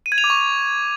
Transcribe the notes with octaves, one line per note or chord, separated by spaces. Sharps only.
D#7
G#6
F7
D6
C#6